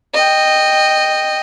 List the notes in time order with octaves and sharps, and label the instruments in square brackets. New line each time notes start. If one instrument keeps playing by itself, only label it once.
[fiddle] D#5 G5